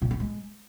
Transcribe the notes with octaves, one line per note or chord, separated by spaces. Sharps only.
A#2
B3
G#3